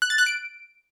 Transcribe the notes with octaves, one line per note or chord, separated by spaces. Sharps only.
F#6
A6
F#6
D7